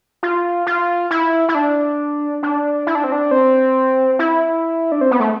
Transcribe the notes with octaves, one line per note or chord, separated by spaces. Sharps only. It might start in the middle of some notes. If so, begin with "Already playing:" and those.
F4
F4
E4
E4
D4
D4
E4
D4
C4
D4
C4
E4
D4
C4
B3
A3